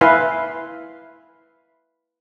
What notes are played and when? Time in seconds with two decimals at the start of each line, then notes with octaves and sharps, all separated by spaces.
0.01 E4 B4 E5 F5 G#5 C6